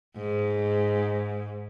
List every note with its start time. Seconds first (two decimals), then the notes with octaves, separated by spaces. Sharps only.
0.17 G#2